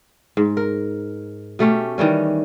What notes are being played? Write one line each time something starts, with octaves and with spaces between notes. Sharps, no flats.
G#2
A#4
B2 A3 C#4 G4
D#3 E3 G3 C#4